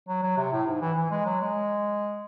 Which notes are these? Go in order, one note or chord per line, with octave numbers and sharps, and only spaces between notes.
F#3
F#3
C3
A2
G#2
E3
E3
G#3
F#3
G#3